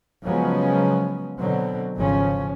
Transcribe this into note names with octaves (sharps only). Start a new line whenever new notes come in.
C#3 F3 F#3 G#3 B3 C#4
B2 D3 F#3 C4
G#1 C#3 F3 C#4